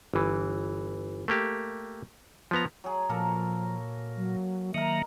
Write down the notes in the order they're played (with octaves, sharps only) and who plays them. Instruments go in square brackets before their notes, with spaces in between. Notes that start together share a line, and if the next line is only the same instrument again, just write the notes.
[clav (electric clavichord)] G1 E3
A3 A#3 G4
F3 B3 A#5
[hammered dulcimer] F#3 G#4
[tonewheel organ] A#2 [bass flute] F3 [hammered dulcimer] A#3 A4 A#4
[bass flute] F#3
[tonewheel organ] D#3 F#3 A#3 [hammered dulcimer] A#4 D#5 [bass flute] E5